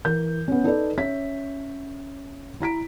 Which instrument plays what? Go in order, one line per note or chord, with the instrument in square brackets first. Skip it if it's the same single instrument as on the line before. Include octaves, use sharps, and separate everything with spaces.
[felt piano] E3 A#4 G6
B3 C#4
D#4 A4 B4 D5
C#4 C#5 E5 B6
E4 A#5 B6 D7